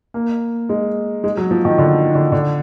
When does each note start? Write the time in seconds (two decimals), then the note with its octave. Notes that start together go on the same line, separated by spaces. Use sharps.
0.14 A#3
0.69 G#3
1.24 G#3
1.37 F#3
1.51 F3
1.65 D#3
1.78 D3
2.15 D3
2.32 D3